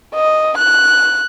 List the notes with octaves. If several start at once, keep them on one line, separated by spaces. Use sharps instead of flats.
D#5
F#6